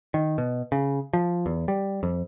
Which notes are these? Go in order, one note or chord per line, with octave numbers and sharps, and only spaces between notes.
D#3
B2
C#3
F3
E2
G3
F2